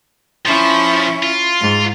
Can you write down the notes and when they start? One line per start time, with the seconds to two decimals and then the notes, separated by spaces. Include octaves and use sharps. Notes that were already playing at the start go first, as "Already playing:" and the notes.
0.46 F3 C#4 E4
1.23 F4
1.60 G#2